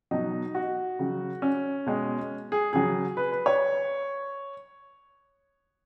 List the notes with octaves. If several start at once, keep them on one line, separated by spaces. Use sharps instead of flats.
B2 F#3 D#4
F#4
C#3 F#3
C#4
B2 G#3
G#4
C#3 F#3 G#4
B4
B4
C#5